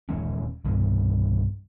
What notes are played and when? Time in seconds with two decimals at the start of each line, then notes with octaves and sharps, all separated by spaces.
0.09 D#1 E3 G#3 C#4
0.65 C2 G2 B2